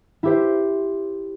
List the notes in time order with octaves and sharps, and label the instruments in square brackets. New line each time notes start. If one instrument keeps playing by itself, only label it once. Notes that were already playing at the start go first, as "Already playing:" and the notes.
[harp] E4 G4 C5